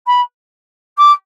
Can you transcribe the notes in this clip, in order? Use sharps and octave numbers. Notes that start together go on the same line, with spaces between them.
B5
D6